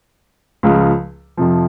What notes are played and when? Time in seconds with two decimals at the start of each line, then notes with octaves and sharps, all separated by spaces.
0.63 C#2 C#3 F3
1.37 F2 C3 F3